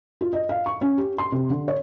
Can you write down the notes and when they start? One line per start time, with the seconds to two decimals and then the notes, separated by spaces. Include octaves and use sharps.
0.21 F4
0.33 D#5
0.49 F5
0.66 C#6
0.81 C#4
0.98 G4
1.18 C6
1.32 C3
1.50 D3
1.68 C#5